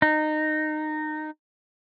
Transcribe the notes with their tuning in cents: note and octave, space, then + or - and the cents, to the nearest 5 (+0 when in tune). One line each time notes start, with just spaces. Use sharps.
D#4 -20